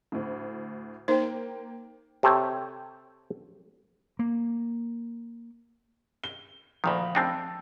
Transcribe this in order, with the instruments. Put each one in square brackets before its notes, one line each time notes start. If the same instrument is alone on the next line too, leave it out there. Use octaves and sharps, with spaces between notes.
[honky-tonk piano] D2 A2
[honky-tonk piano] A#3 G5 [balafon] D#4 C5
[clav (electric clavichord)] C3 G4 A4 C#5 G5
[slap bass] A#3
[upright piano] G7
[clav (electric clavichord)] D2 A#2 D#3 [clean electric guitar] F3 F5 B5
[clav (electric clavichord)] C4 D4 D#4 [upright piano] G5 A5 E6